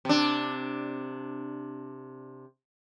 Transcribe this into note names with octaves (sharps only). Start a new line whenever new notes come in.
C3 D4